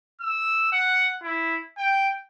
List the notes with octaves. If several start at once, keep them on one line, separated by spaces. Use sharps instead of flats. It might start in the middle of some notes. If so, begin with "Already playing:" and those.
E6
F#5
E4
G5